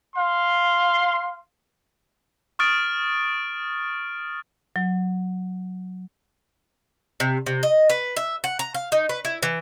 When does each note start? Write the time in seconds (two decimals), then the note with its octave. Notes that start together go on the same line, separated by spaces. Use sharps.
0.16 F5 C6
2.59 C#6 D#6 F6 A6 D7
4.76 F#3
7.20 C3
7.46 C3
7.63 D#5
7.90 B4
8.17 E5
8.44 F#5
8.59 A#5
8.74 F5
8.92 D#4
9.09 B4
9.25 E4
9.43 E3